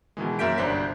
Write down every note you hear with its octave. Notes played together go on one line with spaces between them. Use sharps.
B2 D#3 E3 G#3
F#2 A#3 E5 G6 B6 D7
G1 C2 D4 C5 B6